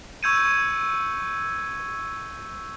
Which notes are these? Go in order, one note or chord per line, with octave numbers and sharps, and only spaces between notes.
C#6 E6 G6 G#6 C#7 D#7